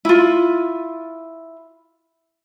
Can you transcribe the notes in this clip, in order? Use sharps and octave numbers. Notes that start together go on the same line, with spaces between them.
E4 F4